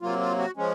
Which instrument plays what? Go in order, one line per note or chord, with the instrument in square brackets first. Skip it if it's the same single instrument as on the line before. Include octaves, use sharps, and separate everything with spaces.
[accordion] C3 F#3 A#3 F4
F4
F#4
F3 G#3 C#4